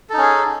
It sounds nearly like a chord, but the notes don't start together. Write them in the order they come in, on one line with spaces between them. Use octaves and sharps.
A4 D#4 C#4 G#4